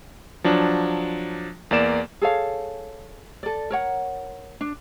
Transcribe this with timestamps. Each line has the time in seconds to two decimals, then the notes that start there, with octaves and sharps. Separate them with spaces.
0.44 F3 F#3 D4
1.71 E2 A#3 D5 E7
2.21 G#4 A4 C#5 F5
3.43 A4 D5
3.70 A#4 C#5 F#5
4.61 D4